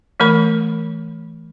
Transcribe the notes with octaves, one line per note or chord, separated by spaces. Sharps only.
E3 A3 A#4 B5